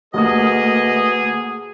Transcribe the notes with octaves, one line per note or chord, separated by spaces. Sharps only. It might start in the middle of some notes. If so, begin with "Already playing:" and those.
D2 A3 A#3 F#4 G#4 B4 D#5 D#6